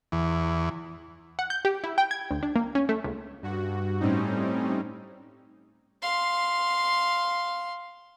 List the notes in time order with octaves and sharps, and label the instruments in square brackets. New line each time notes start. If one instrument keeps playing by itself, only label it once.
[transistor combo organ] E2
[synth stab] F#5
G6
G4
E4
G5
G#6
D2
D4
A#3
C#4
A3
C#2
[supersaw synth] G2 F#4
A2 G3 C4 C#4 D#4
[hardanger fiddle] F5 C6